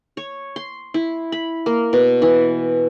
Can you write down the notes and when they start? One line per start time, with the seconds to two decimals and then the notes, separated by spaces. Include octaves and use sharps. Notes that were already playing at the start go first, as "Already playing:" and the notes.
0.17 C#5
0.56 C6
0.94 E4
1.32 B5
1.66 A#3
1.93 B2
2.22 E3